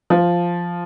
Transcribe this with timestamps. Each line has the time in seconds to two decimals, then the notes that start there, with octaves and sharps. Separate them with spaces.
0.10 F3